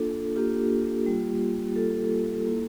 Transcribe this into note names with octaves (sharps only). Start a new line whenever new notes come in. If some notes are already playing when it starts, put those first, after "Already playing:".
Already playing: A#3 D4 F4 A4
A#3 D4 F4 G4
G3 A#3 F4
G3 A#3 F4 A4
A#3 E4